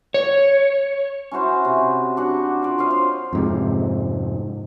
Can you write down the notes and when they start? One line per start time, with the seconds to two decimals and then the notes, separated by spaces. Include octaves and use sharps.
0.14 C#5
1.31 C#4 E4 F#4 C5
1.65 C3
2.17 D4 F#4 F#5
2.62 F4 D5
2.78 C5 C#5 D#5 F5
2.91 C5
3.33 F2 G#2 C3